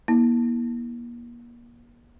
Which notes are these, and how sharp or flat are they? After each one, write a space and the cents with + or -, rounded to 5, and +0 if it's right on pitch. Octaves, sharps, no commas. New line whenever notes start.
A#3 +35 E4 -35